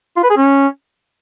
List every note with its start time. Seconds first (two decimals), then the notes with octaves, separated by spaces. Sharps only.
0.17 F4
0.23 B4
0.30 G#4
0.37 C#4